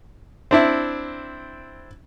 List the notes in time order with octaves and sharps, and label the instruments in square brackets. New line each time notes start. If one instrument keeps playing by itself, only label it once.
[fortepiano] C4 D4 E4